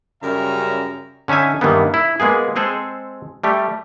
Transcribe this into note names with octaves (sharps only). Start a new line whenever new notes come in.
F#2 C#3 G3 A#4 E5 A#5
D3 C#4 D#4 E5 G#5
G2 D#3 E3 G3 A#3 B3
E4
G#3 A#3 B3 G#4
G#3 C4 G#4 A4 C5
G3 A3 G4